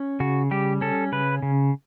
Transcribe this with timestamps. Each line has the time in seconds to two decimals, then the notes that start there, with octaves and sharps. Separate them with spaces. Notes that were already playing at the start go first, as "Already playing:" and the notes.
Already playing: C#4
0.20 C#3 F#4
0.51 G3 G4
0.81 C#4 A4
1.12 C#3 B4
1.43 C#3